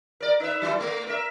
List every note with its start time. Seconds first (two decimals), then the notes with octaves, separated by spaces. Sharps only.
0.20 A#4 D5
0.40 D#4 B4 E5
0.62 F#3 E4
0.78 A3 A#3
1.07 A#4 E5